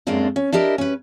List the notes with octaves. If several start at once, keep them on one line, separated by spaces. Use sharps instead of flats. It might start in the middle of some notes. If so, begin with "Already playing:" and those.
F#2 A2 G#3 A#3 C4 D4
C#4
D4 E4 G4 A#4 D#5
C#4 B4